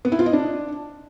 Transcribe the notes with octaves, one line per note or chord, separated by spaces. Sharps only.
B3
E4
F4
D#5
D4